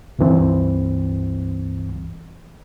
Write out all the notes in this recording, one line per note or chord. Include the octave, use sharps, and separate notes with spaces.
C#2 G2 E3 C4